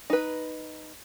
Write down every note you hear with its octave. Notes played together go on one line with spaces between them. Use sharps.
D#4 B4